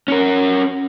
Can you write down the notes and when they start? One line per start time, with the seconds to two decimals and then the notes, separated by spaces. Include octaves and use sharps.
0.08 C#4 A#4